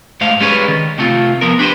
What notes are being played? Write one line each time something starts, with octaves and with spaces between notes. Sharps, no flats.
G#2 A3 C5 F5
G3 G#3 C#4 G#4 B4 C#5
D#3
C3 A3 C4 F4
F3 B3 A#4
D4 G4 B4 C5